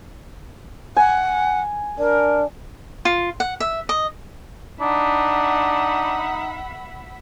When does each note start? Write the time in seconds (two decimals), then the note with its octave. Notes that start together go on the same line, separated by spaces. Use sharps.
0.97 F#5 G#5
1.99 D4 A#4
3.05 F4
3.40 F#5
3.60 E5
3.89 D#5
4.81 D4 D#4 E5 F#5 B5